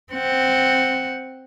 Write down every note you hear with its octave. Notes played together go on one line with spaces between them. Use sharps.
C4 F#5